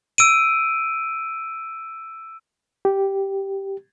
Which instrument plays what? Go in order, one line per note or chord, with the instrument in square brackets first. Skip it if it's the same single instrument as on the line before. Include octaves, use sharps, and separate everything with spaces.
[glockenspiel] E6 D7 D#7
[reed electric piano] G4